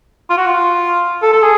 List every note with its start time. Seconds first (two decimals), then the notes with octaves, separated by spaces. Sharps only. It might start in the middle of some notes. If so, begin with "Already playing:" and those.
0.30 F4
0.38 F#4
0.46 F4
1.22 A4
1.33 A4
1.42 G#4